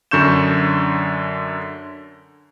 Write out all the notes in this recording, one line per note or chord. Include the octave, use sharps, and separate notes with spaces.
F#2 D3 C#6 G6 E7